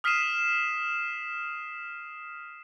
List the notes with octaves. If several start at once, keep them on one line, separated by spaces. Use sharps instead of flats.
D#6 F6 B6 C7 D#7 E7